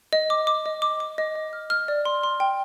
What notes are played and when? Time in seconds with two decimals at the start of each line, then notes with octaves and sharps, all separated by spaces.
0.13 D#5
0.30 D6
0.47 D6
0.66 D#5
0.82 D6
1.00 D6
1.18 D#5
1.35 D#5
1.53 F6
1.70 F6
1.88 D5
2.05 C6
2.23 C6
2.40 G5